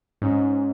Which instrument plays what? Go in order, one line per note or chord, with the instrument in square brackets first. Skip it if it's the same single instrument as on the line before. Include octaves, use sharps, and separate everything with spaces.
[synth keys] G#2 [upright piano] C#4